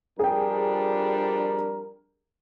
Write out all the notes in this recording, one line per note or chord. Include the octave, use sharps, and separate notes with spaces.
F2 G3 D4 G#4 A#4 G5